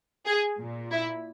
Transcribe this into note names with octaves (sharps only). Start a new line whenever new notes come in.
G#4
A#2
E4